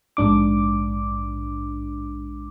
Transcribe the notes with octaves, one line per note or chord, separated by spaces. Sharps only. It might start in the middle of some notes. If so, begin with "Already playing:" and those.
A#1 G#2 D4 D6